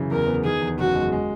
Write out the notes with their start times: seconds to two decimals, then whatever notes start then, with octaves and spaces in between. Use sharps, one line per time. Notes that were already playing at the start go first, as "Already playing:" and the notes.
Already playing: F#2 C#3 E3
0.11 E2 A#4
0.27 B3
0.44 D#3 G#4
0.61 E2
0.78 F#1 F#4
0.95 G#3
1.12 G#3